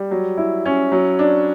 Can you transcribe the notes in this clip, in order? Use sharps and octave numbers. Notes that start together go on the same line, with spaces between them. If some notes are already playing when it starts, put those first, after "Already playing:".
Already playing: G3
F#3
E4
C#4
F#3
D4